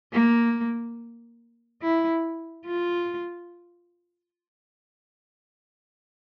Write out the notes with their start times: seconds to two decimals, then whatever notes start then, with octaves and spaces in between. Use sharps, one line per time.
0.13 A#3
1.82 E4
2.67 F4